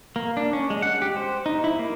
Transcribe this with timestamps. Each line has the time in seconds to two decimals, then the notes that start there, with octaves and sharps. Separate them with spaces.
0.16 A#3
0.37 D4
0.53 C#4
0.70 G#3
0.82 F#5
1.02 G4
1.17 C5
1.46 D#4
1.64 E4
1.79 A#3